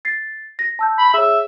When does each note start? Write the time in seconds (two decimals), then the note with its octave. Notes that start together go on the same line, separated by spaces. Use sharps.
0.05 A6 C7
0.59 A#6
0.79 A5 E6 G6
0.99 B5
1.14 G#4 C#5 E5